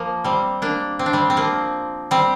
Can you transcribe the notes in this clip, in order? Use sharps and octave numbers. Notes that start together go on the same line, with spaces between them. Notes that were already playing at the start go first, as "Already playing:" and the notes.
Already playing: F3 A#3
G3 C4
A#3 D4
C4
D4
G3 C4
C4
F3 A#3
G3 C4